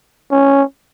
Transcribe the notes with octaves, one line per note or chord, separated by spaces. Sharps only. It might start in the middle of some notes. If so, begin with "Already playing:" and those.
C#4